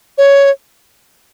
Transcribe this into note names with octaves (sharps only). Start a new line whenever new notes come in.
C#5